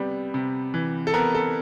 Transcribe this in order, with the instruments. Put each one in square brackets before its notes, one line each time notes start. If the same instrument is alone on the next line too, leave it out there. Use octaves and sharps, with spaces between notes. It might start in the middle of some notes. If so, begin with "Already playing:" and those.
Already playing: [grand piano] C3 G3 B3
C3
E3
A4
B3 A#4
A4